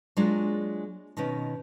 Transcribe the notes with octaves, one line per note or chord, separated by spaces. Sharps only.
F#3 G#3 A#3 D4 F4 G#4
B2 D#3 B3 C#4